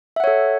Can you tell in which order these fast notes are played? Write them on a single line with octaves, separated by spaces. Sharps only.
E5 F#5 C#5 A4